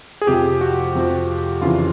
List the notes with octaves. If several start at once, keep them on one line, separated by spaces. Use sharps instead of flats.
G#4
F2 C3 F3 G4
F#4
F2 C3 F3
F2 C#3 E3 F4